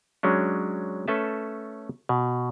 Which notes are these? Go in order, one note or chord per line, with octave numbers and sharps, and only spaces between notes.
F#3 G#3 C#4 D4
A3 C#4 A4 B4 E5 A5
B2